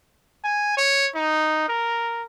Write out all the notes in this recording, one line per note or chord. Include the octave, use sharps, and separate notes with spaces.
G#5
C#5
D#4
A#4